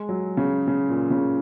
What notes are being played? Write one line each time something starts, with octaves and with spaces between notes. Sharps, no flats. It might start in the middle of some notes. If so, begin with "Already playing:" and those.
Already playing: G#3
F#3
C#3
C#3
A#2
C#3